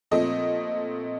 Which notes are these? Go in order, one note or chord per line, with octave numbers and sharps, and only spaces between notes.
A#2 F3 A3 C4 D#5